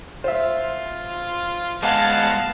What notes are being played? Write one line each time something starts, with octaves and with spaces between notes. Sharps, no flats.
F4 C5 E5
G#3 B3 F5 F#5 A5